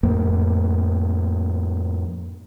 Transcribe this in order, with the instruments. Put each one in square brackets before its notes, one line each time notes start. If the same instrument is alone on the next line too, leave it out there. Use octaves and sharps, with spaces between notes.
[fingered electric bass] F2 A2 A#3